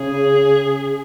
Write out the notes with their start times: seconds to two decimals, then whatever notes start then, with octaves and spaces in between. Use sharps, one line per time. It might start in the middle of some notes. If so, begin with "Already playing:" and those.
Already playing: C#3 G#4